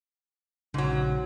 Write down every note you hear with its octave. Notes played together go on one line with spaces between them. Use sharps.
A#1 G#2 C#3 F#3